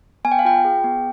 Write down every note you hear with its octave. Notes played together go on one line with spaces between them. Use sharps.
B3 G#5
G5
F5
F4 G5
G#4
B3